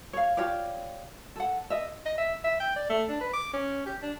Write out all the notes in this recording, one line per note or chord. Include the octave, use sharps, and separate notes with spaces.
C#5 F5
F4 G4 C#5 D5
A4 F#5
D#5 E5
D#5
E5
E5
G5
D5
A3
D4
B4
D6
C#4
G4
D4